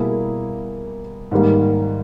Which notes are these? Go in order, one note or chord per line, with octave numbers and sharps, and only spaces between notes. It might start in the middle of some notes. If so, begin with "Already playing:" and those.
Already playing: B2 G3 A#3 E4 G#4
G#2 D#3 G3 A#3